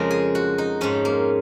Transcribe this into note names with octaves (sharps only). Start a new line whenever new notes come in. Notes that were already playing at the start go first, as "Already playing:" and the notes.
Already playing: F2 C#3 F3 G#3 A#4
G#4
F#4
D#4
G#2 F3 G#3 C#4
A#3